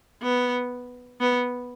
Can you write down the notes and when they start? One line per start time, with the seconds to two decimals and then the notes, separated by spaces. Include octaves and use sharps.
0.22 B3
1.20 B3